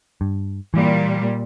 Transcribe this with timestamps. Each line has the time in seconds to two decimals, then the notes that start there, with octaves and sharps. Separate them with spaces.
0.21 G2
0.74 A#2 E3 G3